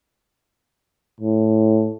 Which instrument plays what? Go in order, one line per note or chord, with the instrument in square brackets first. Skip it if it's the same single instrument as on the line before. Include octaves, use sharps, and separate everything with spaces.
[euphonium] A2